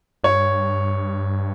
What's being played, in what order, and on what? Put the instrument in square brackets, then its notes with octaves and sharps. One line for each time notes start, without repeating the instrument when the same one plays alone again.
[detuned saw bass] G2 [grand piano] C#5